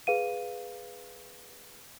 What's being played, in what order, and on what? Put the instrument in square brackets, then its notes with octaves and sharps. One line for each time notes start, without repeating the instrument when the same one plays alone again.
[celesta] G#4 B4 F5 D#7